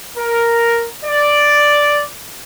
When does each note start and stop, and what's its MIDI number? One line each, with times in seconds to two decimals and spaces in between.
0.17 0.86 70
1.05 2.04 74